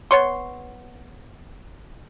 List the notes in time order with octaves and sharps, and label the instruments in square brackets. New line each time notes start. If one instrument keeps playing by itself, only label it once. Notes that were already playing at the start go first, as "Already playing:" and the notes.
[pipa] B3 C#5 C6